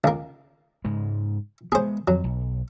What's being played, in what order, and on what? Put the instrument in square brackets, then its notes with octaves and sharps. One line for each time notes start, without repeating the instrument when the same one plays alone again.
[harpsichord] C#2 A#3
[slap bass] G#2 C#3 G#3
[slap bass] G#3 A#3 B3 [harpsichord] G#4 C5
[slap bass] F2 [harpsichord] F#3
[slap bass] B1